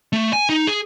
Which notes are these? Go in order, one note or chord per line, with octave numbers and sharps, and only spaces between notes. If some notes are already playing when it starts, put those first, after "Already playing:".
A3
G#5
D#4
G#4